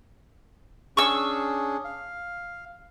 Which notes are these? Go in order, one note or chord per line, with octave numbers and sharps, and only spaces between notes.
C#4 D4 G#4 C#6 E6
F5